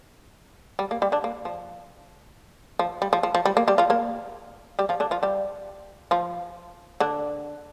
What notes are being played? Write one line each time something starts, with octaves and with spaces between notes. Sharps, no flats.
G3
A#3
G3 G4
D3 D4
A#3
F3
F3
G3
F3
F3
F3
G3
A#3
G3 G4
F3 F4
A#3 A#4
G3 G4
F3 F4
D3 D4
F3 F4
G3 G4
F3 F4
D3 D4